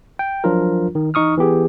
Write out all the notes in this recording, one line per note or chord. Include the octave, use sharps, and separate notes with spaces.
G5
F3 F#3 D4 F4 A#4
D#3
E3 D#4 C#6 D#6 F6
E3 B3 G4 G#4